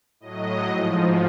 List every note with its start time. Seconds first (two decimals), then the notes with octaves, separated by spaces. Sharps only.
0.20 A2 F#3 D#5
0.67 G#2 F3